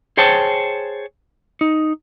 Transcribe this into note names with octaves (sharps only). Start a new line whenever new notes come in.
G#4 C5 C#5 G5 A5
D#4